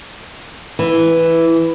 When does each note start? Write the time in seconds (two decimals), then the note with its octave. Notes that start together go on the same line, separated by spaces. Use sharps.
0.79 E3